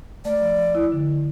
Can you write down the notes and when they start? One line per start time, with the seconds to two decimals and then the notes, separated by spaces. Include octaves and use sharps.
0.25 A3 D5
0.41 F3
0.58 F3
0.75 E4
0.92 D3